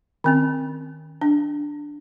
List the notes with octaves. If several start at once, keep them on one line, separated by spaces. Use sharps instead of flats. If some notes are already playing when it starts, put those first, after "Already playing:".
D#3 C4 C#4
D4